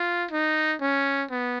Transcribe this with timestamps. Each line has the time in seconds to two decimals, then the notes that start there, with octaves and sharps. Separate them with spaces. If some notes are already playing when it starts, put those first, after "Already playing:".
Already playing: F4
0.31 D#4
0.80 C#4
1.30 B3